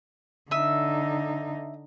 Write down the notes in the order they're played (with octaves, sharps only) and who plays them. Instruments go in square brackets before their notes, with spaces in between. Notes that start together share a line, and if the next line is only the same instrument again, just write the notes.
[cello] D3 D#4 [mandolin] E5 D#6